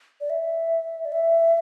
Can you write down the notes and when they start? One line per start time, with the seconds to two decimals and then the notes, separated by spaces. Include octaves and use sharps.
0.21 D5
0.30 E5
1.05 D5
1.12 E5